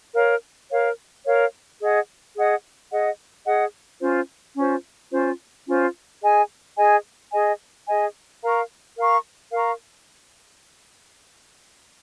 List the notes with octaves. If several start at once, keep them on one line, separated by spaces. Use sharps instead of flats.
A#4 C#5 F5
A#4 C#5 F5
A#4 C#5 F5
G#4 D#5 F#5
G#4 D#5 F#5
G#4 D#5 F#5
G#4 D#5 F#5
C#4 F4 C5
C#4 F4 C5
C#4 F4 C5
C#4 F4 C5
G#4 D#5 G#5
G#4 D#5 G#5
G#4 D#5 G#5
G#4 D#5 G#5
A#4 F5 A#5 C#6
A#4 F5 A#5 C#6
A#4 F5 A#5 C#6